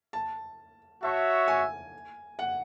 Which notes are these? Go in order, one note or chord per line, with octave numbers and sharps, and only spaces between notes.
A5
F#4 C#5 E5 A5
G#5
F#5